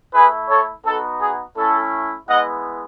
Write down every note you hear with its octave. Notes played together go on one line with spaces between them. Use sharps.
A3 E4 G#4 B4
A4 C#5
B3 D#4 F#4 A4
G#4
A3 C#4 E4 A4
G#3 B3 E4 D#5 F#5